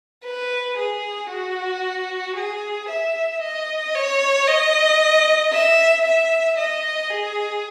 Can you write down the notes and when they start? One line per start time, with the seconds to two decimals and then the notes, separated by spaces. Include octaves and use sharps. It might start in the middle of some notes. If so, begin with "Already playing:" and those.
0.25 B4
0.78 G#4
1.30 F#4
2.36 G#4
2.89 E5
3.41 D#5
3.94 C#5
4.47 D#5
5.52 E5
6.05 E5
6.58 D#5
7.11 G#4